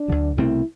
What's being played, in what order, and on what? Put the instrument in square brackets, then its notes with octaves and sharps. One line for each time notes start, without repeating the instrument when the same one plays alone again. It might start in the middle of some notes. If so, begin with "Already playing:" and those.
Already playing: [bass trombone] D4
[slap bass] D2 D3 F#3
[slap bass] C2 B2 A3 C4 [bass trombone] E4